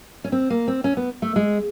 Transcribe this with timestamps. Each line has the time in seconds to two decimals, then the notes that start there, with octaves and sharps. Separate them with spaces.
0.24 C#4
0.32 C4
0.50 A#3
0.68 C4
0.84 C#4
0.97 B3
1.22 A3
1.36 G#3